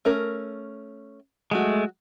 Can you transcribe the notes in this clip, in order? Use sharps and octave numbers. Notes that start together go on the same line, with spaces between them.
A3 C#4 A#4
F#3 G#3 A3 F#4